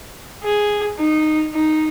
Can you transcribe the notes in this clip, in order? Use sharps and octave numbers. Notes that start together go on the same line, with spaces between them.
G#4
D#4
D#4